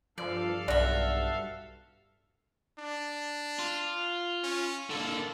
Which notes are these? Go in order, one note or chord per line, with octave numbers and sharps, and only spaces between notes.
G2 F3 A4 D5 F5
B1 F#4 D5 E5
D4
F4
C#4
D3 A#3 A4